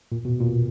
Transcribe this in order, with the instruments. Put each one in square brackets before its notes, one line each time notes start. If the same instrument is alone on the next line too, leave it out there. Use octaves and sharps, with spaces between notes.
[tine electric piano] A#2
B2
A#2